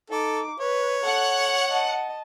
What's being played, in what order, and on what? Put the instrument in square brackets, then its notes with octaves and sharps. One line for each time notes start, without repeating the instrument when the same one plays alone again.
[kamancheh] D#4 D6 [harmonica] A4
[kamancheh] B4 [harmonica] C#5
[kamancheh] A4 [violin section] F#5
[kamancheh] D#5 A5